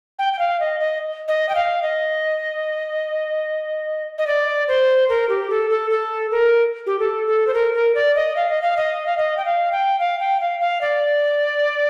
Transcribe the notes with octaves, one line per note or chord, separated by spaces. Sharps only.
G5
G5
F5
D#5
D#5
D#5
G5
F5
D#5
D#5
D5
C5
A#4
G4
A4
A4
A4
A#4
G4
A4
A4
C5
A#4
A#4
D5
D#5
F5
D#5
F5
D#5
F5
D#5
G5
F5
G5
F5
G5
F5
F5
D5